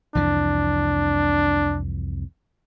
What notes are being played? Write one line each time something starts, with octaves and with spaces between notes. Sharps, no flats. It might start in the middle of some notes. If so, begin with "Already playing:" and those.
C2 F2 E3 D4